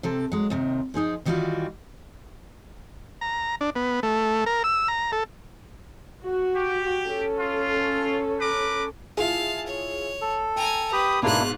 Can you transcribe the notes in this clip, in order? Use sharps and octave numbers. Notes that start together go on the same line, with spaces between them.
C3 C4 A4 A5
F#3 G#3
D#2 C3 D#3
F3 D#4 G#4 C5
D#3 E3 G3 C#4 F4 F#4
A#5
D4
B3
A3
A#4
E6
A#5
A4
F#4
G4
C#4 A4
F4
A#4 B4 D6
E4 F4 G#4 F5 A5
C#5
A4
G5 G#5 A#5
G4 B4 B5 D#6
G#2 B2 A#3 D4 E4 F4 F#6